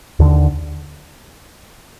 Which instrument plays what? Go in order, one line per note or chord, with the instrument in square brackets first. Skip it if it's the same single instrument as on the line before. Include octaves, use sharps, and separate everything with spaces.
[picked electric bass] D#2 D3